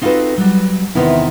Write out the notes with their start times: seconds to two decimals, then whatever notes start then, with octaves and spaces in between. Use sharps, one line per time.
0.01 C4 D#4 F4 F#4 A4 B4
0.38 F#3 G3
0.95 E2 C3 D#3 B3 E4